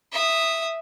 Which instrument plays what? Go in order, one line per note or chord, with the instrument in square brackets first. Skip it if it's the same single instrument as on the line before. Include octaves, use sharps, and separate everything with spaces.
[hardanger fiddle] E5 D#6